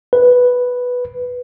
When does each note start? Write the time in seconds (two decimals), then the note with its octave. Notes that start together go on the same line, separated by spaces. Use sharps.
0.13 B4